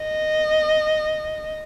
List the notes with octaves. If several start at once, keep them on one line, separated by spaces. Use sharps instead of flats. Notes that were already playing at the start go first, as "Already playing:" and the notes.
Already playing: D#5